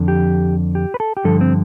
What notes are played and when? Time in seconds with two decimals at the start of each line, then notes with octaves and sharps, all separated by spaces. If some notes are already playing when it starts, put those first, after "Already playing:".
Already playing: F2 D3 F3
0.08 G4
0.75 G4
0.94 B4
1.00 A4
1.17 G4
1.24 G2 D3 F3 A4
1.41 C4